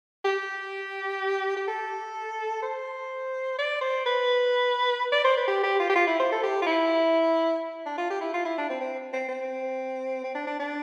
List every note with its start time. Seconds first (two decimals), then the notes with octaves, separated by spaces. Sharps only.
0.25 G4
1.56 G4
1.67 A4
2.62 C5
3.58 D5
3.81 C5
4.06 B4
5.12 D5
5.24 C5
5.37 B4
5.47 G4
5.63 G4
5.79 F4
5.89 G4
5.95 F4
6.07 E4
6.19 C5
6.32 A4
6.43 G4
6.62 F4
6.66 E4
7.86 D4
7.97 F4
8.10 G4
8.21 E4
8.34 F4
8.45 E4
8.58 D4
8.69 C4
8.81 C4
9.13 C4
9.28 C4
10.23 C4
10.35 D4
10.47 D4
10.59 D4